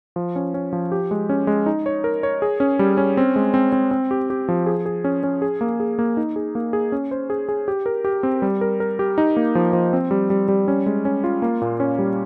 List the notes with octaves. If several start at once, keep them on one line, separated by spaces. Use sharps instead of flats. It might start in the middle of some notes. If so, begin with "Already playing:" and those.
F3
C#4
C#4
F3
G4
G#3
C#4
G#3
D#4
C#5
A#4
C#5
G#4
C#4
G3
C#4
C4
G#3
C4
C4
C4
G4
G4
F3
G#4
G#4
C#4
C#4
G#4
A#3
G#4
A#3
D#4
G#4
A#3
G#4
C#4
C5
G#4
G#4
G4
A#4
G4
C4
G3
A#4
A#4
G4
D#4
A#3
F3
F3
C4
G3
G3
G3
C#4
G#3
C#4
F4
A#3
A#2
C#4
G3